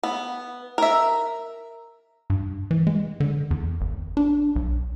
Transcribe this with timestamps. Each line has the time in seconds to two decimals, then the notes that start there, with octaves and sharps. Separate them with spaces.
0.03 B3
0.78 A#4 E5
2.30 G2
2.71 E3
2.87 G#3
3.20 D3
3.51 E2
3.81 G#1
4.17 D4
4.56 B1